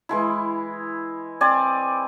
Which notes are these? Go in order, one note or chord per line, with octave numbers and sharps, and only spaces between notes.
E3 G#3 E4
C4 D5 G#5